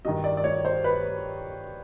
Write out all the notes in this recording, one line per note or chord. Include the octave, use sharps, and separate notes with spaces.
G2 D#3 D#5
D5
D5
C#5
C5
B4